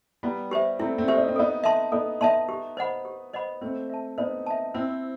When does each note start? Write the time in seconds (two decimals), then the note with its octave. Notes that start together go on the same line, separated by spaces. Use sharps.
0.23 G3 B3 E4
0.51 G4 C5 E5
0.79 A3 C4 E4
0.98 A3 C4
1.08 G4 C5 E5
1.17 D#4
1.28 C4
1.36 B3 D#4 A4
1.64 E5 A5 C6
1.92 B3 D#4 A4
2.21 B3 D#4 E5 A5 C6
2.49 G4
2.77 C5 D#5 F#5 B5
3.05 G4
3.33 C5 D#5 F#5 B5
3.61 A3 C4 C5
3.90 E5 A5
4.18 B3 D#4 C5
4.46 E5 A5
4.74 C4 E4 C5